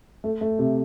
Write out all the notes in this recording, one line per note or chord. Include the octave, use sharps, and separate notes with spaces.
A3
A3
C3